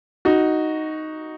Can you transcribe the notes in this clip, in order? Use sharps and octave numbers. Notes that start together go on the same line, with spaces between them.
D#4 F#4